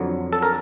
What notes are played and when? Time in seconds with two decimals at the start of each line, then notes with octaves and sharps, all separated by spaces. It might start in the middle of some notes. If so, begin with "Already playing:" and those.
Already playing: F2 D3 F#3
0.33 A4
0.42 A#4